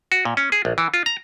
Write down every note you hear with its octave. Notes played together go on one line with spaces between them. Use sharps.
F#4
A#2
C#4
G#4
A#1
E3
F4
A#5